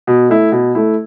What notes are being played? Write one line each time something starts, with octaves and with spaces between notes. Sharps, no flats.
B2
A3 E4
B2
A3 E4